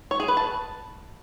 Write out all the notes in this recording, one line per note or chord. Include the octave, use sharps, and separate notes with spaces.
C#5
G#4
B4
A5